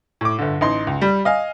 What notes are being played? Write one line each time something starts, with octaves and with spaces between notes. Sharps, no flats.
A2 D6
G1 D3
A1 D#4 C6
C#2
G3
D#5 F5 G#5